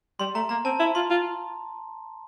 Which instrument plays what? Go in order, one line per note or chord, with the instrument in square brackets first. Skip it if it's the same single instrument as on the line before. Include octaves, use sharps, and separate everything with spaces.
[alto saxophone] G3 [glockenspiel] C6
[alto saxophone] A3 [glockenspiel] A#5
[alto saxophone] A#3 [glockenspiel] A#5
[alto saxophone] C4 [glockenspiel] A5
[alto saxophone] E4
[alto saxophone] F4 [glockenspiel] C6
[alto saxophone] F4